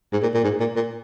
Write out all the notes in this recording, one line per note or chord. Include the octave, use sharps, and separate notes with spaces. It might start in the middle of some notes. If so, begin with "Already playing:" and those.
G#2
A#2
A#2
G#2
A#2
A#2